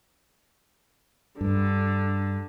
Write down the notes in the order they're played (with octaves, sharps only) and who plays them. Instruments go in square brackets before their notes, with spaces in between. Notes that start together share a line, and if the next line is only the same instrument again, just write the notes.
[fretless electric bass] G2 [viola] D3